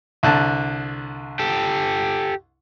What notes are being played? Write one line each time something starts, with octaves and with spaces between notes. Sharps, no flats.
C2 D3 A5
G4 A4